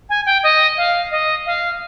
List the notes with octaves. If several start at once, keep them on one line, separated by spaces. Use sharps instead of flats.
G#5
G5
D#5
F5
D#5
F5